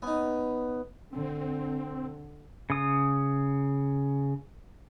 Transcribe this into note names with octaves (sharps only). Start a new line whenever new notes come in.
B3 C#4 D#4
D3 C4
C#3 D#6